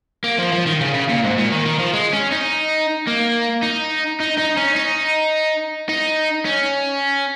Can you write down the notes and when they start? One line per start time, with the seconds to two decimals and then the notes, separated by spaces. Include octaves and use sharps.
0.24 A#3
0.39 F3
0.53 F3
0.67 D#3
0.81 C#3
0.94 C#3
1.09 A#2
1.23 G#2
1.37 A#2
1.52 D#3
1.66 D#3
1.79 F3
1.93 G#3
2.13 C#4
2.32 D#4
3.07 A#3
3.62 D#4
4.20 D#4
4.38 D#4
4.57 C#4
4.76 D#4
5.89 D#4
6.45 C#4